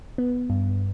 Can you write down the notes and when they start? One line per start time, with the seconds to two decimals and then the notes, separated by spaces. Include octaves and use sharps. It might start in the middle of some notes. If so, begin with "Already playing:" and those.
0.18 B3
0.50 G2